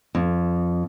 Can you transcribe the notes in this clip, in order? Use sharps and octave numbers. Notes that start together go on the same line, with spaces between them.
F2